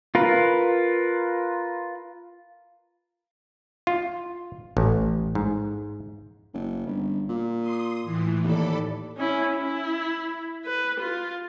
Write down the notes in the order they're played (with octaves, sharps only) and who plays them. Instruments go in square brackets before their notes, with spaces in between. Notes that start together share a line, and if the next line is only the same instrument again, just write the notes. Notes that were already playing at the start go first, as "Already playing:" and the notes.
[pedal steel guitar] F4 A#4 B4
[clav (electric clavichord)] F4
A1
G#2
[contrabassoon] F#1
G1
A#2
[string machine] C6 D#6
A2 E3
[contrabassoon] D#2 [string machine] A4 D5 B5
[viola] C#4 E4
E4
B4
F4